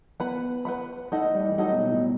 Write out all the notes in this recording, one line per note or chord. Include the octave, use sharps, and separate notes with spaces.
B3 B4 F#5 B5
B4 F#5 B5
A3 D#4 A4 D#5 F#5
G3
E3
F#3 D#4 A4 D#5 F#5
B2
A2